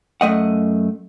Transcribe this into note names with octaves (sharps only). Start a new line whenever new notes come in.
F#2 A3 D#5 F#5